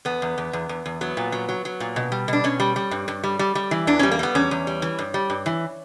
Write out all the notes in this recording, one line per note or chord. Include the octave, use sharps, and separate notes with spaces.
E2 B3
E2
E2
E2
E2
E2
F#3 B3
A#2
F#3
F#3
F#3
A#2
B2
G3
B2 D4
B2 C#4
G3
G3
G2
G2
G3
G3
G3
E3
E2 D4
G3 C#4
A#3
G3 B3
E2 C#4
E2
G3
E3
G2
G3
G2
E3